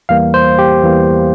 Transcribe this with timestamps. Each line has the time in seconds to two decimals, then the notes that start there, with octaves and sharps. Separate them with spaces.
0.09 E2 E3 G3 A#3 F5
0.34 C5
0.59 G4
0.83 E2 E3 G3 A#3